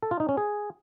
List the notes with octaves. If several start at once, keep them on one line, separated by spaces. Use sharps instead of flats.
A4
F4
D#4
C#4
G#4